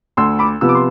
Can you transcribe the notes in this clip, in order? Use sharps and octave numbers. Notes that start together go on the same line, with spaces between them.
D2 C6 E6
B5 D6
C3 F3 B3 E6
D6
C6